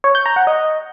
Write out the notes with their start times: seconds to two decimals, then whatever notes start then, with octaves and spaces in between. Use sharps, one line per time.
0.04 C#5
0.15 G6
0.26 A#5
0.36 F#5
0.47 D#5